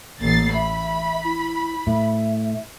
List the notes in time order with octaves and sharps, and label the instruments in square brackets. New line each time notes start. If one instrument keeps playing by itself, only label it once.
[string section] A1 A6 C7 [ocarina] A#3
[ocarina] E5 [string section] B5
[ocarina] E4
[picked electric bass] A2 [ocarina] E5